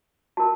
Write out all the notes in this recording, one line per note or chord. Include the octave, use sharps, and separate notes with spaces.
F#4 A#4 A5